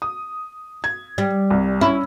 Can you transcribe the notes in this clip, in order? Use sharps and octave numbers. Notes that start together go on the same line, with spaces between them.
D#6
G#6
G3
C2
C#4 E4